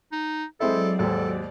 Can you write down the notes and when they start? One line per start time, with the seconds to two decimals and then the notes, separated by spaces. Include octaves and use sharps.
0.12 D#4
0.60 F#3 G#3 C4 E4 A4 D5
0.99 D#2 G#2 A4